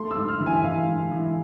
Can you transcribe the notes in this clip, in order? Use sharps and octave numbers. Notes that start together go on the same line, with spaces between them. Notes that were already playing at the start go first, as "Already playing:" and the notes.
Already playing: A3 C6
E6
G#2
F6
E3
G#5
E5
E3 F5
G#2
E3